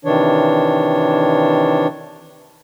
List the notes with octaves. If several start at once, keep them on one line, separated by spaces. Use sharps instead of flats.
C3 D#3 E3 D4 C#5